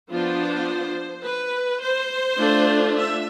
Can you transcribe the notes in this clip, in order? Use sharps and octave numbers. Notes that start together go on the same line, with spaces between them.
F3 B3 D4 F4 C5
B4
C5
A3 D4 F4
E5